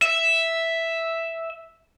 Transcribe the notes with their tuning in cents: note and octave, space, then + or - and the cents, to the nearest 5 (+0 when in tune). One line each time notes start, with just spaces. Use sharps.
E5 +0